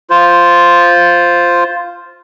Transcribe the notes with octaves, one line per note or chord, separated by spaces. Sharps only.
F4 C5